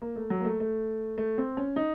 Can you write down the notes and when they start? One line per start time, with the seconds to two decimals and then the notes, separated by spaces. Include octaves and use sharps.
0.02 A#3
0.16 A3
0.30 F#3
0.41 A#3
0.45 A3
0.60 A3
1.18 A3
1.38 C4
1.57 C#4
1.76 D#4